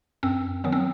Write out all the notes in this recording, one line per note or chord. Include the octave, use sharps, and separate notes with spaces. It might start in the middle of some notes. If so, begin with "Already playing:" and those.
F#2 C4
D#3 F#3 B3
C4